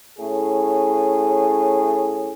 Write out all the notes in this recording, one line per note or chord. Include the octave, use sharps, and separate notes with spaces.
A2 C#4 G#4